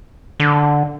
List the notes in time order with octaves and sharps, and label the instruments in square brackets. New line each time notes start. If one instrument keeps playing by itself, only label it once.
[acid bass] D3